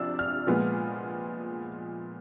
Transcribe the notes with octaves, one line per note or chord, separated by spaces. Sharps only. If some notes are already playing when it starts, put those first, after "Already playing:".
Already playing: C3 F3 D4 E6
F6
A#2 F3 G#3 B3